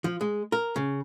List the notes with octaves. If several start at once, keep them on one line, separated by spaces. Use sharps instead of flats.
F3
G#3
A#4
C#3